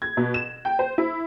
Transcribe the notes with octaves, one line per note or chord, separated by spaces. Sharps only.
G#6
B2
E7
G5
C5
E4